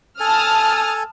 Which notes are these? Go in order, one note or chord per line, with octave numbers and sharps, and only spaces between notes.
A4 G#5 A5 D#6 F6